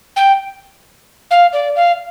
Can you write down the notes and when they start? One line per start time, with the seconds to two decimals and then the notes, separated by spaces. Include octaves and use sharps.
0.16 G5
1.31 F5
1.53 D5
1.76 F5